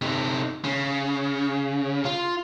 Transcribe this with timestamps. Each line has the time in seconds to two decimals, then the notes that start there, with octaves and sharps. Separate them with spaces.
0.02 C3 D#4
0.64 C#3
2.05 F4